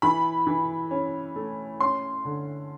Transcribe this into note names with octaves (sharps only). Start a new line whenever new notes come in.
E3 B5
E3
C#4
A3
C#4 C6
D3